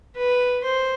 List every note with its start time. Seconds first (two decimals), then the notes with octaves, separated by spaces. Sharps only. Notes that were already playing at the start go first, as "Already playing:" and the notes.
0.17 B4
0.64 C5